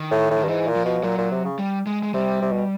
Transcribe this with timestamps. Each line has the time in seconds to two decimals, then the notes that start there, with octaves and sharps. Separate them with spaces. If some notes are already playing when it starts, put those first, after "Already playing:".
Already playing: D#3
0.11 A2
0.30 A2
0.38 D#3
0.44 G2
0.48 G#2 E3
0.67 A#2
0.76 F3
0.85 B2
1.03 A#2 F#3
1.18 A#2
1.31 C3
1.45 C#3
1.59 G3
1.86 G#3
2.03 G#3
2.13 C3 G3
2.42 C3
2.52 B2